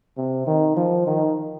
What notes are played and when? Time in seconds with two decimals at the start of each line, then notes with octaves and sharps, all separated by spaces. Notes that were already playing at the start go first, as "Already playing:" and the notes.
0.17 C3
0.47 D#3
0.77 F3
1.07 D#3